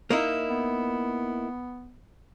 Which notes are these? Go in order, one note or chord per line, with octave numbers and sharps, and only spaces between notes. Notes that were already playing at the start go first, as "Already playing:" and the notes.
A#3 D#4 E4
B3